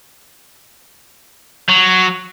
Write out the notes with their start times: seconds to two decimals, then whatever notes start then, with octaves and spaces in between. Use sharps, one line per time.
1.69 F#3